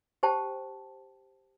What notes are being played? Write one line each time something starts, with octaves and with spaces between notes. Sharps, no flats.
G4 C5 G5 A5